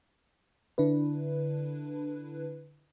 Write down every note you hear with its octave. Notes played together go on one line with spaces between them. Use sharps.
D3 D4 E4 B4